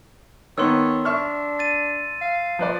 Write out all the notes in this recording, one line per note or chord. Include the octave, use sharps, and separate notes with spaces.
D#3 B3 C#5 C6 E6
D4 E5 C#6 F6
A6 D#7
F5
F3 B4 D5